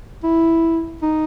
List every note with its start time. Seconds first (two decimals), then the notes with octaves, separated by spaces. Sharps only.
0.23 E4
1.02 D#4